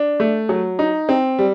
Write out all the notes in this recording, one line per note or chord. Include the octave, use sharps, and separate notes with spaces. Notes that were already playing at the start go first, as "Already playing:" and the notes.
Already playing: D4
A3
F#3
D#4
C4
G3